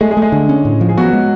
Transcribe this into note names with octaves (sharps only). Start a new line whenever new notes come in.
G#3 A3 G#4
G#3 G#4
A3
G#3 G#4
D3
C#4
A2
F3
G#4
F#3 B3 F#4
G#3